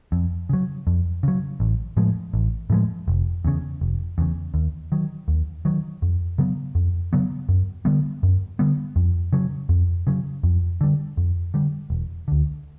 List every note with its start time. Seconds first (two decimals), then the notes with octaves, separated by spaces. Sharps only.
0.12 F2
0.49 C#3 F#3
0.87 F2
1.23 C#3 F#3
1.60 A1
1.97 A2 F3 G#3
2.34 A1
2.70 A2 F3 G#3
3.08 F1
3.45 E2 C#3
3.81 F1
4.18 E2 C#3
4.54 D#2
4.92 D#3 F#3
5.28 D#2
5.65 D#3 F#3
6.02 F2
6.38 C#3 F#3 B3
6.75 F2
7.13 C#3 F#3 B3
7.49 F#2
7.85 D3 G3 B3
8.23 F#2
8.59 D3 G3 B3
8.96 F2
9.33 C#3 F#3
9.69 F2
10.07 C#3 F#3
10.43 F2
10.81 D3 G3
11.17 F2
11.54 D3 G3
11.90 E1
12.28 D2 D3